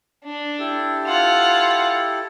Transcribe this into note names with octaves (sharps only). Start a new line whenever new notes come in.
D4
E4 G4 A4
F4 F#5